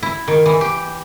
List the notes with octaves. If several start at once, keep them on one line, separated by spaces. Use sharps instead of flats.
E4
D#3
E3
G4